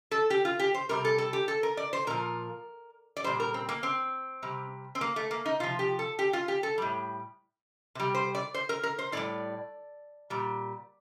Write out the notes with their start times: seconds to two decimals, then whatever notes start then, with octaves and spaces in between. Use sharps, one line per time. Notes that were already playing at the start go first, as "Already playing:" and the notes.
0.11 A4
0.30 G4
0.45 F4
0.59 G4
0.74 C5
0.89 C3 G3 A#4
1.05 A4
1.18 A4
1.33 G4
1.48 A4
1.63 A#4
1.77 D5
1.93 C5
2.07 A#2 F3 A#4
3.17 D5
3.24 A#2 G3 C5
3.40 A#4
3.54 C4
3.69 A#3
3.83 C4
4.43 C3 G3
4.95 C4
5.01 A#3
5.16 A3
5.31 A#3
5.46 D#4
5.60 C3 F3 F4
5.79 G4
5.99 A4
6.19 G4
6.33 F4
6.48 G4
6.63 A4
6.78 A2 G3
7.95 C3 G3
8.15 C5
8.35 D5
8.54 C5
8.69 A#4
8.83 A#4
8.99 C5
9.12 A2 G3 D5
10.30 A#2 G3